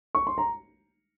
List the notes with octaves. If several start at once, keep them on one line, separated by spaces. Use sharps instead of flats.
C#6
C6
A#5